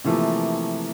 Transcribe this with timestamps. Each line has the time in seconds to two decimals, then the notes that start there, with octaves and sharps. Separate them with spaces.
0.04 C3 E3 F3 A3 A#3